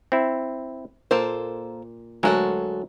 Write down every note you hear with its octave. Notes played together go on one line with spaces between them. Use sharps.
C4 E4
A#2 A#3 A4 C5
D2 F#3 G#3 F#4 A4 A#4